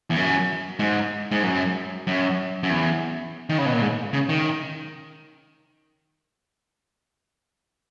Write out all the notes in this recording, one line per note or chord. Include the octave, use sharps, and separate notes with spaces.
E2
F#2
G#2
G#2
F#2
F#2
F#2
E2
D#3
C#3
B2
A#2
G#2
C#3
D#3